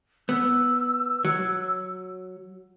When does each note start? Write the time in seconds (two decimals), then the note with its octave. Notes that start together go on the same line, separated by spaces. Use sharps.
0.29 B3 E6
1.25 F#3